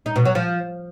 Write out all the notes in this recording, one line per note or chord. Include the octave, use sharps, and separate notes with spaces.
D#4
B2
F#3
F3